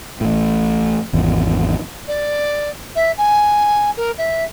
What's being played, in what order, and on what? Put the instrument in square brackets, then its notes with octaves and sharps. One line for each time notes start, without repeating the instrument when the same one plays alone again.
[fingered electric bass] A1 A2
G#1 E2
[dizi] D5
E5
G#5
A#4
E5